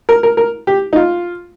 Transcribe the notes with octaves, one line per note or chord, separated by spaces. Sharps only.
A#4
A#4
A#4
G4
D#4
F4